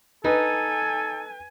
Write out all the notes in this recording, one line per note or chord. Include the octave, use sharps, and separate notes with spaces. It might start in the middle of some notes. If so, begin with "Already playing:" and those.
D#4 A4 B4 G#5